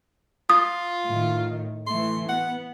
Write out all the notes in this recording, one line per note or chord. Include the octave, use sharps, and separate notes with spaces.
F4 D#6
A2 D#3
E3 A3 C6
B3 F#5